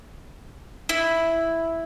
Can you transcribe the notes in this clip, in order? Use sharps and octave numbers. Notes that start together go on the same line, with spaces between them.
E4